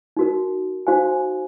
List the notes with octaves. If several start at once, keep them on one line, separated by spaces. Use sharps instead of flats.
D#4 F#4 A#4
D#4 F#4 C5 F5 G#5